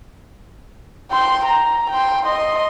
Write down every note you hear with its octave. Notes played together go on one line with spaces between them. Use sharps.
G5 C6
A#5
G5 C6
D#5 C6